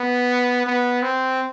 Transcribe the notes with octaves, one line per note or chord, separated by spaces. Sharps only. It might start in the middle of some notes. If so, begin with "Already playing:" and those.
Already playing: B3
B3
C4